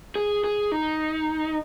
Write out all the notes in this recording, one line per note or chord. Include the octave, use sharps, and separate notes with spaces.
G#4
G#4
D#4